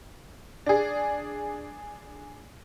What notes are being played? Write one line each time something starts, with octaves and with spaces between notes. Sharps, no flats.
D4 G#4